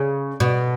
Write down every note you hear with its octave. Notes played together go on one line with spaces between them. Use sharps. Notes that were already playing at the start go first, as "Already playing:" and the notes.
Already playing: C#3
B2